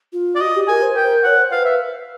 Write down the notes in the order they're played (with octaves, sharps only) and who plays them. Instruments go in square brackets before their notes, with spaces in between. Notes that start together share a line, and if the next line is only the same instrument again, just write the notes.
[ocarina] F4
[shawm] D5
[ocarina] F#4 [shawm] D#5
[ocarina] G4
[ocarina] A#4 [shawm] G#5
[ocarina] C5
[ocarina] A#4 [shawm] G5
[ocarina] C#5 [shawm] F#5
[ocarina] C5
[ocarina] B4 [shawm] F5
[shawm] E5